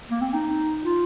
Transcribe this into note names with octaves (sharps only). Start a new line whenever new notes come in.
A#3
C4
D#4
F4